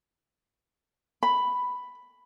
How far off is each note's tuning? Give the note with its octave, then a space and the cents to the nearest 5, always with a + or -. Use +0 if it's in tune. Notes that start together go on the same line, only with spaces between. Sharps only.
B5 +5